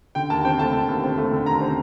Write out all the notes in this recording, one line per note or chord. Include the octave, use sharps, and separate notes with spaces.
D3 G5
D#2 A5
C4 G5
A3 A5
D3
D#2
C4
A3
D3
D#2 A#5
C4